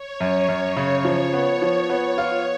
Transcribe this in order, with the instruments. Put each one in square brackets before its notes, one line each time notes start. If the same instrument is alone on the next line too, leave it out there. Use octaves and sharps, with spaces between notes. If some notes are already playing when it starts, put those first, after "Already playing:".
Already playing: [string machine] C#5
[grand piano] F#2
F#2
C#3
[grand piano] F3 [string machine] C#5
[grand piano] B3
F3
B3
F4